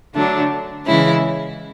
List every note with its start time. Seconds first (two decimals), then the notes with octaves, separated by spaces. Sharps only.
0.15 D3 F#3 A3 D4
0.85 C#3 E3 G#3 C#4 E4